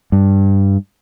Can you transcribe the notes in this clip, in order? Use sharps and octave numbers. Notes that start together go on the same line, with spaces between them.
G2